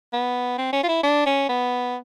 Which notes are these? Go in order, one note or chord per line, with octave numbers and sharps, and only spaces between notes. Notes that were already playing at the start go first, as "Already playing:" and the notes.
B3
C4
C#4
F4
E4
D4
C#4
B3